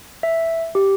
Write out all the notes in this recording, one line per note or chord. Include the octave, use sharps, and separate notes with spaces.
E5
G4